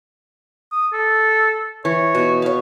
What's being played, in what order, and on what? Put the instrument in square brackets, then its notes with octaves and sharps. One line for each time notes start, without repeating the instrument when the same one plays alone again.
[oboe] D#6
A4
[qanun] E3 [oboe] C#5
[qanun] B2
C#5 F5